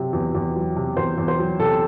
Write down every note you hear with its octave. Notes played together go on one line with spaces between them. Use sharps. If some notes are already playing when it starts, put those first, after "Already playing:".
Already playing: C3 F#3
E2
E2
F#3
C3
E2 C5
E2
C5
F#3
C3 A4